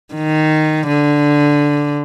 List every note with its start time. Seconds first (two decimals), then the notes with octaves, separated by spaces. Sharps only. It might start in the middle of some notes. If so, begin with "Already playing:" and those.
0.15 D#3
0.88 D3